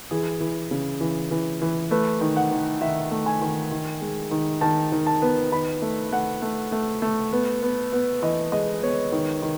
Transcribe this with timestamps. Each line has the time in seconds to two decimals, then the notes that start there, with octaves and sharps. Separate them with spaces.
0.11 E3 G#4
0.40 E3
0.71 C#3
1.01 E3
1.31 E3
1.62 E3
1.91 A3 B4
2.21 D#3
2.36 F#5
2.51 D#3
2.81 D#3 E5
3.11 A3
3.26 G#5
3.42 D#3
3.71 D#3
4.02 G#3
4.31 D#3
4.61 D#3 A5
4.92 D#3
5.07 A5
5.22 B3
5.52 D#3 B5
5.82 A3
6.12 A3 F#5
6.42 A3
6.72 A3
7.02 A3
7.32 B3
7.62 B3
7.93 B3
8.22 E3 D#5
8.52 G#3 D#5
8.82 B3 C#5
9.12 D#3
9.42 D#3